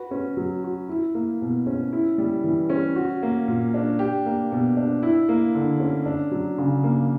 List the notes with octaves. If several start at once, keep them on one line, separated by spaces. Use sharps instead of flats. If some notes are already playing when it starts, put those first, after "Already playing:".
Already playing: F#4 B4
C#4
F#3
F#4
E4
A#3
B2
C#4
E4
G3
E3
C#4
F#4
A#3
A#2
D4
G4
A#3
B2
D4
E4
A#3
D3
C#4
D4
F#3
C#3
A#3